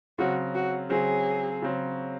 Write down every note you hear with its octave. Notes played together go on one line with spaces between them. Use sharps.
C#3 F#3 C4 F#4
F#4
C#3 F#3 C4 G#4
C#3 F#3 C4